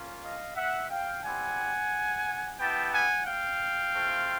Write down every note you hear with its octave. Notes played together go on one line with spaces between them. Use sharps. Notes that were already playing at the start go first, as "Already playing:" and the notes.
Already playing: A#3 C#4 F4
D#5 F5
E5 F#5
F5 G5
G3 C4 E4 G4 F#5 G#5
B3 E4 G4 G5 A5
F#5 G#5
F5 G5
A3 C4 F4